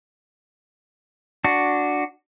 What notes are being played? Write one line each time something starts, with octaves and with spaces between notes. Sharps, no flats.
D4 F#4